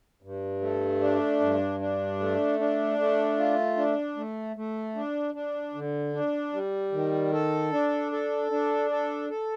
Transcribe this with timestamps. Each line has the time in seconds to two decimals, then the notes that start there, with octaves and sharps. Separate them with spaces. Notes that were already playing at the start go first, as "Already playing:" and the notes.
0.23 G2
0.61 A3
1.01 D4
1.40 G2
1.80 D4
2.20 A3
2.59 D4
2.98 A3
3.38 F4
3.77 D4
4.17 A3
4.56 A3
4.95 D4
5.34 D4
5.74 D3
6.13 D4
6.53 G3
6.92 D#3
7.33 A4
7.72 D4
8.12 A4
8.51 D4
8.90 A4
9.30 A4